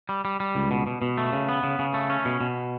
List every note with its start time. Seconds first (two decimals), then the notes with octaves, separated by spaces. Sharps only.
0.09 G3
0.25 G3
0.40 G3
0.55 C#2
0.71 B2
0.87 B2
1.02 B2
1.18 A3
1.33 C#3
1.49 B3
1.63 C#3
1.79 C#3
1.94 A3
2.10 C#4
2.25 B2
2.41 B2